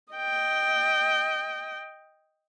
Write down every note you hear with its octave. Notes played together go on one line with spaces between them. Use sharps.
D#5 G5